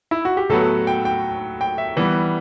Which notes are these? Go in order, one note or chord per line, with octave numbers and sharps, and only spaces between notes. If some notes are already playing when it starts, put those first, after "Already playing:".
E4
F#4
G4
A2 F#3 B3 A4
G5
G5
G5
E5
E3 G3 B3